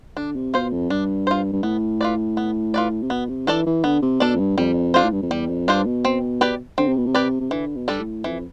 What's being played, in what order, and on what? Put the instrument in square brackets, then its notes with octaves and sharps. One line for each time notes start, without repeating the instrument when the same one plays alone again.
[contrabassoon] D3 [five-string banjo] D4
[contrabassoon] C3
[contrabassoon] B2 [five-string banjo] F4 C5
[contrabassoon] F2
[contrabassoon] G2 [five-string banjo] D4
[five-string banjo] F4 C5
[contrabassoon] G2
[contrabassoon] A2 [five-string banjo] B3
[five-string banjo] F4 B4 D5
B3
F4 B4 D5
[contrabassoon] C3
[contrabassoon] B2 [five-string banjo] B3
[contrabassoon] C3
[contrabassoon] E3 [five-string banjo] D4 A4 D5
[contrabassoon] E3
[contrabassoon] D3 [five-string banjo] B3
[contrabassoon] C3
[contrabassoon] B2 [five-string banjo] D4 A4 D5
[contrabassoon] F2
G2
[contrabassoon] F2 [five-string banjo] G3
[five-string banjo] D4 F4 C5
[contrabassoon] A2
G2
F2
[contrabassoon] E2 [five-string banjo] G3
[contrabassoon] F2
[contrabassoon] G2 [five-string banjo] D4 F4 C5
[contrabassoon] B2
[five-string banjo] C4
G4 B4 D5
[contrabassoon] D3 [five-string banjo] C4
[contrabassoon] C3
B2
C3
[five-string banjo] G4 B4 D5
[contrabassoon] C3
[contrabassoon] D3 [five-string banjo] E3
[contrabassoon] B2
[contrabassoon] G2 [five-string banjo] G3 D4 A4
[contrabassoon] A2
[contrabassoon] F2 [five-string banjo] E3